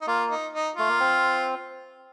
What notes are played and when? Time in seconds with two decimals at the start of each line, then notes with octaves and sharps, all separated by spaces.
0.02 D#4
0.07 A#3 F4
0.31 D#4
0.53 D#4
0.76 A3 F4
0.89 A#3
1.00 C4